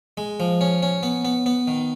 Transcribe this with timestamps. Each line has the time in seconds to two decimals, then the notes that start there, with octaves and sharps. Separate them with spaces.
0.17 G#3
0.40 F3
0.61 C#4
0.82 C#4
1.03 B3
1.25 B3
1.46 B3
1.68 D#3